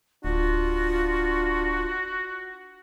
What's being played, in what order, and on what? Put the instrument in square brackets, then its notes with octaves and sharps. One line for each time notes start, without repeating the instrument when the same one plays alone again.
[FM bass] D1 [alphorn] D4 [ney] F4 [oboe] F#4